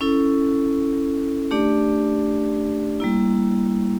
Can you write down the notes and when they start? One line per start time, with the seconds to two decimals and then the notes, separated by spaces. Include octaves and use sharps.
0.01 C#4 E4 A4
1.51 A3 D4 G4 D5
3.00 G3 A#3 E4